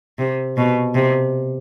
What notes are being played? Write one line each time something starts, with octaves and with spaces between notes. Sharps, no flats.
C3
B2
C3